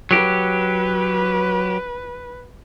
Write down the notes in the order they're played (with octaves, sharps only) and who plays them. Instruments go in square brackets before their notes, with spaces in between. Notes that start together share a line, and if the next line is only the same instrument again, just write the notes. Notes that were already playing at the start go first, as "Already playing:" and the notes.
[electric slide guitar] F#3 G4 [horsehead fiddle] B4